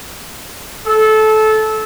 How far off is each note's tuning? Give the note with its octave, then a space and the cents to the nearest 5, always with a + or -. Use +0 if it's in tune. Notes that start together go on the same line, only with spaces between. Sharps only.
A4 -20